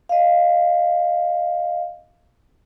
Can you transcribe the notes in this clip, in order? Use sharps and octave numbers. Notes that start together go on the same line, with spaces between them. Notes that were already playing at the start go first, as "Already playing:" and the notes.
D#5 F5